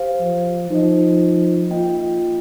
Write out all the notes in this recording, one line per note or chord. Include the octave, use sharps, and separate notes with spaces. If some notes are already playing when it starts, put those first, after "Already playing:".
Already playing: G4 C5 F5
F3
F3 D#4 C5 D#5
A#3 F4 D#5 G5